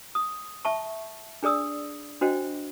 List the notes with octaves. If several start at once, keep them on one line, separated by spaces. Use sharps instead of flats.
D#6
E5 A5 C#6
D4 G#4 D5 D#6 E6
D4 F#4 C5 D#5 G5